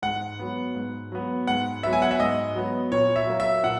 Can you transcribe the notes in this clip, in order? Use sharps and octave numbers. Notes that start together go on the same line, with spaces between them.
G#2 F#5
F#3 B3
G#2
F#3 B3
G#2 F#5
F#3 B3 E5
G#5
F#5
E5
G#2 D#5
F#3 B3
A#2 C#5
E5
F#3 A#3
E5
A#2 F#5